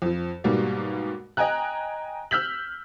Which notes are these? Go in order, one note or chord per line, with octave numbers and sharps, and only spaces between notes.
F2 F3
G#2 B2 G3 A#3
D#5 G5 G#5 A#5 F#6
E6 F6 G6 B6 F#7